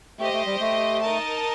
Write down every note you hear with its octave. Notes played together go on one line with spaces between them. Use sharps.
A3 G4 C5 D#5
A3
G3
A3
D#4 A#4 D#5 A5